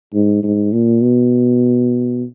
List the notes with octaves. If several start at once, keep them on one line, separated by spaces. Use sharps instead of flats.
G#2
G#2
A#2
B2